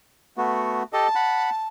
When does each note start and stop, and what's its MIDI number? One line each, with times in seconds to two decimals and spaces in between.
0.37 0.83 57
0.37 0.83 59
0.37 0.83 66
0.93 1.08 67
0.93 1.08 69
0.93 1.08 75
0.93 1.68 81
1.15 1.50 78
1.15 1.50 83